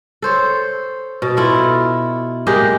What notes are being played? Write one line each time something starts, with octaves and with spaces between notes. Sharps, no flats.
A4 C5 C#5
B2
E4 F4 A4
G#3 A#3 G4 G#4